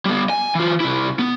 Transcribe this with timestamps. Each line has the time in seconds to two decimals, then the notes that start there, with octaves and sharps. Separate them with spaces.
0.05 G3 B3
0.30 G#5
0.55 E3 F4
0.80 C2 E4
1.19 B3